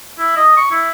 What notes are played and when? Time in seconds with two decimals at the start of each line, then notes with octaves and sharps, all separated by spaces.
0.19 E4
0.37 D#5
0.57 C#6
0.72 E4